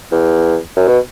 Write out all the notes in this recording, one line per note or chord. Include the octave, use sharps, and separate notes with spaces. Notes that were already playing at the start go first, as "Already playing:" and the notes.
E2
F#2
B2